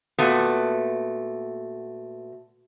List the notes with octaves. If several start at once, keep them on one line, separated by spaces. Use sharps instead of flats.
A#2 A3 B3 F#4 E5